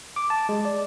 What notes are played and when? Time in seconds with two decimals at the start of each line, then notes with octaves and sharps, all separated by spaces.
0.16 D6
0.30 A5
0.49 G#3
0.65 D5